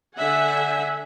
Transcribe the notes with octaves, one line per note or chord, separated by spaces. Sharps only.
D3 E5 F#5 G#5